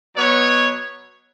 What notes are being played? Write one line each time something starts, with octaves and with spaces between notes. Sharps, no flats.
B2 F#3 B3 C#5